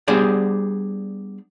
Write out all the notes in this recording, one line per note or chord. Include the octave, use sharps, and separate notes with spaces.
G3 B3 D4 G#4 C5 D5